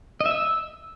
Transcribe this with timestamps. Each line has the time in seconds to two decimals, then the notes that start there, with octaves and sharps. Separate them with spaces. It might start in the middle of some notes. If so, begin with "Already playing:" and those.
0.21 D#5
0.26 E5
0.31 E6